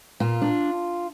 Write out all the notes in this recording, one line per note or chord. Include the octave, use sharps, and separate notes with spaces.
A#2 F4
D4